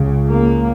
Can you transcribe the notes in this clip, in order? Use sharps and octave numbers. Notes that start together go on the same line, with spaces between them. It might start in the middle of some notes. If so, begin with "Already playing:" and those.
Already playing: C#2 C#3
A#3